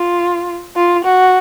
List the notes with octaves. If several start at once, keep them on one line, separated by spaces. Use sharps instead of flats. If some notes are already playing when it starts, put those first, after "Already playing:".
Already playing: F4
F4
F#4